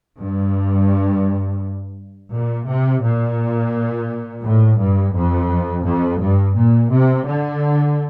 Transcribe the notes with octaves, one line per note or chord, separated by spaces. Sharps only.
G2
A#2
C3
A#2
A2
G2
F2
F2
G2
A#2
C3
D3